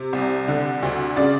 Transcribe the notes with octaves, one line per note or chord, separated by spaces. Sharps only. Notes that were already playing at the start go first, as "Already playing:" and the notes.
Already playing: C3
C2
D3
D2
C#3 D5